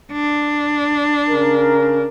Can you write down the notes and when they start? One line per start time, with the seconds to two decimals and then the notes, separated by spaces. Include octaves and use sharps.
0.12 D4
1.29 C#3 A#4